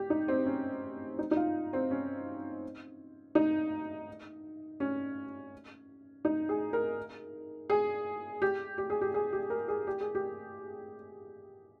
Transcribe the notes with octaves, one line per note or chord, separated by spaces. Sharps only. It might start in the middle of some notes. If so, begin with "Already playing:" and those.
Already playing: G4
D#4
C4
C#4
D#4
D#4
F4
C4
C#4
D#4
C#4
D#4
G#4
A#4
G#4
G4
G4
G#4
G4
G#4
G4
A#4
G#4
G4
G#4
G4